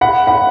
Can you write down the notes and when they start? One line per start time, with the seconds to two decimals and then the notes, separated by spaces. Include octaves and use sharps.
0.01 F#5 B5
0.27 F#5 B5